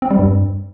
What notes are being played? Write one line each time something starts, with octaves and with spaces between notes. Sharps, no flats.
C4
G3
G2